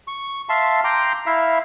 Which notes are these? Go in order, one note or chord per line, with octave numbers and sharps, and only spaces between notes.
C#6
E5 F5 A5 C6
G5 A#5 C6 D6
E4 E5 F5